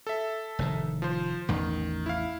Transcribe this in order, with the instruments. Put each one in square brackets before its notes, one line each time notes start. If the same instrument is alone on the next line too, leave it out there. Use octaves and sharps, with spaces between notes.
[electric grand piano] A4 E5
[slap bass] F1 A2 D#3
[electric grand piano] F3 C5
[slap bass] A1 E2 [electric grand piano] D#3
[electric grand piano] E4 F5